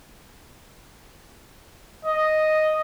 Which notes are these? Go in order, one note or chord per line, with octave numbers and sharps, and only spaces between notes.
D#5